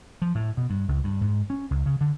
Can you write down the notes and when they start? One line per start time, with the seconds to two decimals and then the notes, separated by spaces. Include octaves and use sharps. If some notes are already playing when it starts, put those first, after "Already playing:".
0.22 F3
0.35 A2
0.57 B2
0.70 G2
0.88 C#2
1.04 G2
1.21 G#2
1.50 C#4
1.71 C#2
1.86 C#3
2.01 D3